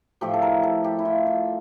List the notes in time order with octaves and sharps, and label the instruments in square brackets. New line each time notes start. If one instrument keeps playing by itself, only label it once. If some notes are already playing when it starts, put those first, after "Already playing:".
[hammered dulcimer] A2 F3 G4
A4
A#4
A4
G4
E4
F4
F4